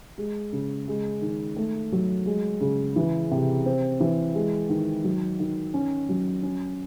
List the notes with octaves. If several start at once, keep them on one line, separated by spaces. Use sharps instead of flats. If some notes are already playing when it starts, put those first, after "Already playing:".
G#3
C#3
G#3
D#3
A3
F#3
G#3
C#3
E3
C3
C4
E3
G#3
D#3
F#3
D#3
C#4
F#3
C#4